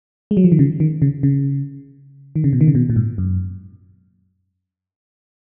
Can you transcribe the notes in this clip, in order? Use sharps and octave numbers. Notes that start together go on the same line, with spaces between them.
G#3
F#3
F3
D#3
C#3
D#3
C#3
C#3
D#3
C#3
B2
D#3
C#3
B2
A#2
G#2
F#2